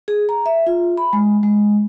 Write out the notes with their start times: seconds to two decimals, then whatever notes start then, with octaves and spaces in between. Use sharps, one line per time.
0.08 G#4
0.29 A#5
0.46 E5
0.67 F4
0.97 B5
1.13 G#3
1.43 G#3